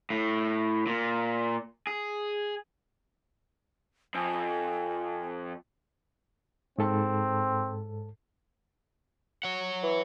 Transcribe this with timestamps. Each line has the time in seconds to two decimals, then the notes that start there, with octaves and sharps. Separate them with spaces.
0.10 A2
0.87 A#2
1.87 G#4
4.15 F2 G#5
6.78 G#2 C4 A4 A5
9.43 C#5 F#5
9.83 E3